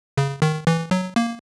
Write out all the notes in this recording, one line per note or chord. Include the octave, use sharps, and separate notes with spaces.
C#3
D#3
E3
F#3
A#3